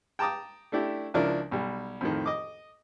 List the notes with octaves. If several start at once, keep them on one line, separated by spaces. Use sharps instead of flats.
G5 A5 A#5 D6 D#6
A3 D4 E4 G4
C#2 F3 D4 E4 A#4
B1 G3
F2 A2 D#3
D#5 D6